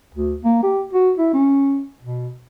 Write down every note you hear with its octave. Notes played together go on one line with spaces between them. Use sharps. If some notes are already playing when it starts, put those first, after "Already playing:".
D2
A#3
G4
F#4
E4
C#4
B2